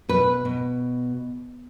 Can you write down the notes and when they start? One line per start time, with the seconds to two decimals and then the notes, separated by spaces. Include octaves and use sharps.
0.09 B2 B4
0.45 B2